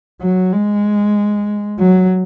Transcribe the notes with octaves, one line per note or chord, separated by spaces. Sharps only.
F#3
G#3
F#3